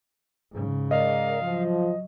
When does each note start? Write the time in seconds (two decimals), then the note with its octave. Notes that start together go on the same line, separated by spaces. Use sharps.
0.51 G#2 C#3
0.91 G#3 A#4 D5 D#5 F5
1.42 F3 F#3